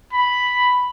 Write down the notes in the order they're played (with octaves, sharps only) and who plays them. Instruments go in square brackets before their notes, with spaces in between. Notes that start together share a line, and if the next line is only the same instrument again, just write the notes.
[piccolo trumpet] B5